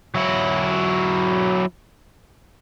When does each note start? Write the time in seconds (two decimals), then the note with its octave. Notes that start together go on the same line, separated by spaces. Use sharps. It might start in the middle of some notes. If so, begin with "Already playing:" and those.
0.15 F#3 E4